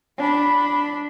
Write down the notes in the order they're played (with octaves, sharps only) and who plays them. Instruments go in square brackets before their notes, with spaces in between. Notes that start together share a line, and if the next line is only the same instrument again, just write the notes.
[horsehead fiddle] D4 B5